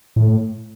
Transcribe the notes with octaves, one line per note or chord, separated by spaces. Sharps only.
A2